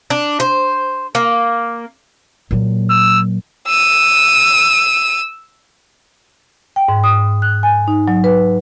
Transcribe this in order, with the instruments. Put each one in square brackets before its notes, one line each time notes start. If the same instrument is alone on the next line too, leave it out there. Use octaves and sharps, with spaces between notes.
[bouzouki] D4
C5
A#3
[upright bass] A#2 F#3
[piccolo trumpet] E6
[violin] E6 D#7
[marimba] G5
G#2
D#6
F#6
G#5
D#4
F#3
B4